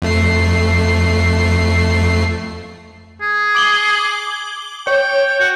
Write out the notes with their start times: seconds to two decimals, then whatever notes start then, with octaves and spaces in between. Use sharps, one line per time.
0.02 F2 A3 C7
3.22 G#4
3.55 D6 F#7 G7
4.87 C#5 G5
5.40 F#4